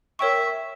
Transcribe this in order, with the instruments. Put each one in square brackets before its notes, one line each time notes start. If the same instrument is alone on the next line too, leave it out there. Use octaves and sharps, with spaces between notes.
[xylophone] A#4 C#5 G5 C#6 [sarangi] E5